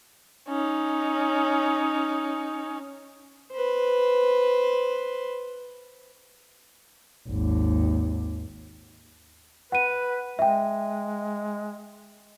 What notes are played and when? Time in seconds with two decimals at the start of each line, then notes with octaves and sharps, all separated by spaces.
0.48 C#4 D#4
3.52 B4 C5
7.28 G#1 D#2
9.72 B4 F#5 D#7
10.39 G#3 E5 G5